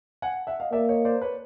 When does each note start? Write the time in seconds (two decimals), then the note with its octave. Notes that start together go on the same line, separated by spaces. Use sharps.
0.22 F#5 G#5
0.47 E5 F#5
0.60 D#5 F5
0.72 A#3 D5 E5
0.89 C#5 D#5
1.05 C5 D5
1.21 B4 C#5